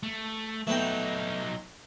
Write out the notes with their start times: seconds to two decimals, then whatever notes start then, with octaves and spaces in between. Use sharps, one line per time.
0.03 A3
0.67 F#3 A3 B3 D#4 G5